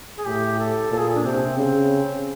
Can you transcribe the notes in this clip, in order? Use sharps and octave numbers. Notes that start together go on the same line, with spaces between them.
G#4
A2 G4
A4
A#2 A4
G#4
D4
C3 C4
C#3 C4